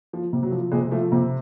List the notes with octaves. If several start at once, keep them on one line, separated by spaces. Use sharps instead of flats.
F3
C3
F#3
F3
C3 G#3
F3 A3
C3